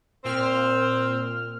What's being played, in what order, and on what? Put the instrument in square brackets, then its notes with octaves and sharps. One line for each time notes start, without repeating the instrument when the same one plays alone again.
[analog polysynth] A#2 F6 [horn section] C4